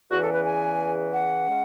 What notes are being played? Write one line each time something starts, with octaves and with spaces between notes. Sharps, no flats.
E2 C#3 E3 F#4
A4
B4
G#5
F#5
C#3 G#3 C#4